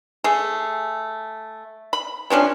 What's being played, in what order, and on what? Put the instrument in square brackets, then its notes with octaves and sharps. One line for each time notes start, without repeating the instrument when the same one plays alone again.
[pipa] A3 G#4
B5
C3 F3 C#4 D4